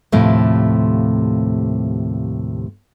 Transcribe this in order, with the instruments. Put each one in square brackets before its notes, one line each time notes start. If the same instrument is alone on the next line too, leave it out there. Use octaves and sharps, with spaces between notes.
[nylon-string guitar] D#2 A2 C3 F3 A3 C5